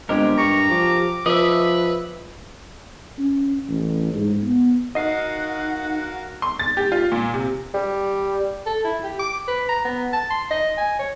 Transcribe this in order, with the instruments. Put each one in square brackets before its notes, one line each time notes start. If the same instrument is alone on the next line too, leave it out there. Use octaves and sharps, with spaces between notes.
[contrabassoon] G1 [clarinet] G#3 [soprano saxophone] C4 [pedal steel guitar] G4 A#4
[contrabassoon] G2 [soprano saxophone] A#5 [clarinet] C#6
[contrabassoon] F3 [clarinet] D6
[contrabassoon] F3 [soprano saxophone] B4 [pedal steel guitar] D#5 E5
[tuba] C#4
A1
G#2
B3
[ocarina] D#4 [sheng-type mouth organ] F#4 A#4 F5 [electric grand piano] D#5 C7 [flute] F#5
[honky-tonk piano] C6
A6
G4
F4
A#2
C3
[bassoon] G3
[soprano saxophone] A4
E4
G4
D6
B4
A#5
B3
A5
C6
D#5
G#5
C#5